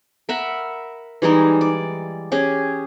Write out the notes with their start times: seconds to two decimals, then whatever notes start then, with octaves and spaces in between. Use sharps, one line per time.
0.29 A#4 E5 F#5 B5
1.22 E3 G3 G#3 D#4
1.61 D5
2.32 C#4 G4 G#4